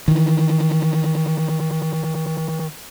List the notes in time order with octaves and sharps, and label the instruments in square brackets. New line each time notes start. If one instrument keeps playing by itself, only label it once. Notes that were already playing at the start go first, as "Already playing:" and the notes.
[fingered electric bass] D#3 E3